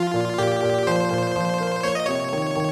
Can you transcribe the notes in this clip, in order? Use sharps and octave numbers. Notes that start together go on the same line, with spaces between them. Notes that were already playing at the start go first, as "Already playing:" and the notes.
Already playing: F3 F4
A#2
A#2 G4
A#2
F3 C5
A#2
F3
A#3
A#3 C#5
D#5
C3 C#5
D#3
D#3